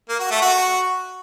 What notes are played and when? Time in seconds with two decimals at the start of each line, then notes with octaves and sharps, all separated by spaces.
0.09 A#3
0.20 F#4
0.31 A3
0.42 F#4